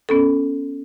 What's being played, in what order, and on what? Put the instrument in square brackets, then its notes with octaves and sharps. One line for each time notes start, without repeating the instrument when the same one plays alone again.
[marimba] B3 C#4 A4